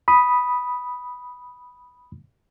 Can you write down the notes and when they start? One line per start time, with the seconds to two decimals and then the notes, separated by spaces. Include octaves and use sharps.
0.08 B5 D#6